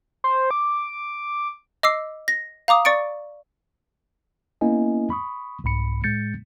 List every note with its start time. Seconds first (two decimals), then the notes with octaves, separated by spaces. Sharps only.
0.24 C5
0.51 D6
1.83 D#5 D6 E6 C7
2.28 A#6
2.68 F5 A#5 D6 D#6
2.85 D5 C#6 A6 C#7 D7
4.61 A#3 B3 C#4 E4 D#5 G#5
5.10 B5 C#6 D#6
5.64 C2 G#2 B5 C#7
6.04 A2 G#3 G6 A6 C#7